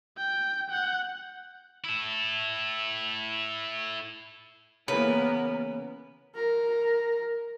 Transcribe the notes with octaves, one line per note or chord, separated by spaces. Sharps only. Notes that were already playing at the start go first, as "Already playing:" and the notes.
G5
F#5 G6
E4 A4
C#3 E3 A#3 B3 A#4 B4
A#4